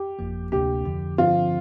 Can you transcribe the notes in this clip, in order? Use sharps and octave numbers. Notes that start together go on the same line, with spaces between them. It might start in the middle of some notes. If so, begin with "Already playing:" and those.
Already playing: G4
G1 F2 F3 A#3
D2 C3 A#3 D4 G4
F2 D3 F3
G2 D3 F3 C4 F4